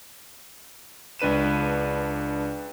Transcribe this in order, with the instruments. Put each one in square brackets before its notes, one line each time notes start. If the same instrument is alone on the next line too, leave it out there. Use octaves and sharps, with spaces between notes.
[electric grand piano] C#2 D4 B4 D#7 E7